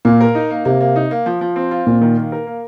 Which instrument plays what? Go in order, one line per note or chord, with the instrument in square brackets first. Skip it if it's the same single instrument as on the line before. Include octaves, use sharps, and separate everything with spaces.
[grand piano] A#2 [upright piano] A#3
[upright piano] A#4
D#4
A#3
[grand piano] C3 [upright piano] A#3
[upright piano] A#3
D#4
A#3
F3
F3
C4
F4
[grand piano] A#2 [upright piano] F4
[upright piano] D#3
A#3
A#4
A#3